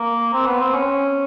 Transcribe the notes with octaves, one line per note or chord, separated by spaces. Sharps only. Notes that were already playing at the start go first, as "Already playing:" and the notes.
Already playing: A#3
C4
B3
C4
C#4